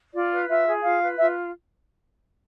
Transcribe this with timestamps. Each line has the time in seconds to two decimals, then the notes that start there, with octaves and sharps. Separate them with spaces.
0.13 F4 D5
0.31 B4
0.49 F4 E5
0.66 G#4
0.84 F4 F5
1.01 B4
1.19 F4 E5